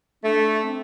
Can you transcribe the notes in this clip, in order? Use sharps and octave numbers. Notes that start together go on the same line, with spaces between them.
A3 D4
C4